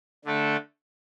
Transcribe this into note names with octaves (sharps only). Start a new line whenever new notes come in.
D3 A3 D4 A4